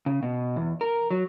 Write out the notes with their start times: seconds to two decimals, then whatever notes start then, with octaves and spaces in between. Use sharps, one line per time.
0.06 C#3
0.23 B2
0.56 E2
0.81 A#4
1.11 F#3